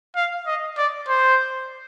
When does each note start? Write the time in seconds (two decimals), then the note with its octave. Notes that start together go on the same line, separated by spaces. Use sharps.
0.16 F5
0.47 D#5
0.78 D5
1.08 C5